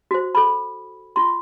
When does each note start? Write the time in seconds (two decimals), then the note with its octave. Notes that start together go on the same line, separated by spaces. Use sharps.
0.11 F#4 C5
0.35 A4 B5
1.16 F4 C6